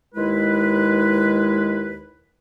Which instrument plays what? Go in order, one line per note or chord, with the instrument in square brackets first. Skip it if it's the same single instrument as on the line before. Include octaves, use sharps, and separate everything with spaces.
[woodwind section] D#2 G#3 E4 B4